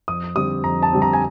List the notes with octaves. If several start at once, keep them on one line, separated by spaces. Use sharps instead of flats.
F2 D#6
D3 G3 C4 D#6
F2 A#5
A5
D3 G3 C4
A#5
G#5